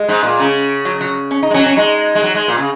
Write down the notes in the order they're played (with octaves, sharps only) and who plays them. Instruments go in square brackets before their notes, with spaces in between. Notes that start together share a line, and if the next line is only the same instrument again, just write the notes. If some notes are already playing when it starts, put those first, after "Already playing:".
Already playing: [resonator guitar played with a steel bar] G#3
[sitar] G#2
A#2
C#3
[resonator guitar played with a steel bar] F#3
F#3
C#4
D#4
[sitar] G#3
[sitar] F#3 [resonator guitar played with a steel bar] C#4
[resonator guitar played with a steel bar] C#4
[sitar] G#3 [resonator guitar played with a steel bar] D#4
[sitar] G#3
F#3
G#3
A#2
C#3